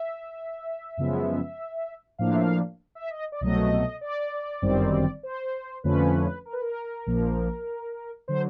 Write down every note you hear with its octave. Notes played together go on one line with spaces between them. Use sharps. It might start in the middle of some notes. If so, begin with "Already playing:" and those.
Already playing: E5
F#2 C#3 F3 G#3 B3
A2 F3 A#3 D4 F5
E5
F5
E5
D#5
D5
C2 B2 F#3 A3 D#5
D5
G1 F#2 D#3 G3 C4
C5
F2 D3 F3 A3 C#4 B4
A#4
B4
A#4
A#1 A#2 F3 A#3
D3 F#3 C5